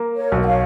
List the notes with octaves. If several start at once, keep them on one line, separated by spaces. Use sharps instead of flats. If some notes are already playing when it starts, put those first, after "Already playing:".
Already playing: A#3
A#4 C#5
B1
F#5
C#5 F5